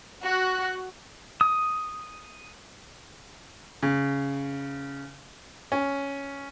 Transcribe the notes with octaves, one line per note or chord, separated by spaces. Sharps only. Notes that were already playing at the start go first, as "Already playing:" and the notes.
F#4 F#6
D#6
C#3
C#4